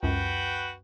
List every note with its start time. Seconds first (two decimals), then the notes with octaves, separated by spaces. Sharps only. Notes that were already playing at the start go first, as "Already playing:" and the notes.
0.03 C#2 F#2 F#4 B4 G5